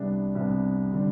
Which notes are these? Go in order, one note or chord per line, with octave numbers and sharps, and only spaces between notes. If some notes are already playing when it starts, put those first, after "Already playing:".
Already playing: C2 C3 G3 B3 D4
C2 C3 G3 B3 D4
D3 G3 D4